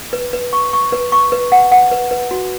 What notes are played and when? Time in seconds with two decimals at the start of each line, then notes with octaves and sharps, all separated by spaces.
0.13 B4
0.33 B4
0.53 C#6
0.73 C#6
0.92 B4
1.12 C#6
1.32 B4
1.52 F#5
1.72 F#5
1.92 B4
2.11 B4
2.31 F#4